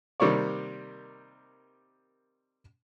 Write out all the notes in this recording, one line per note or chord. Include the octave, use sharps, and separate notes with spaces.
C3 D#3 G3 A#3 C#5 D5